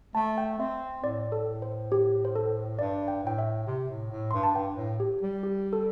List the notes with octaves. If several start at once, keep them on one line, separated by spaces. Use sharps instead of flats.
A3 A5
G5
C4 E5
A2 D5
A4
A2
C5
G4
C5
A4
G2 D5
G5
A2 G5
E5
C3
A2
A2
G2 C6
A5
G2 G5
A2
G4
G3
G4
A4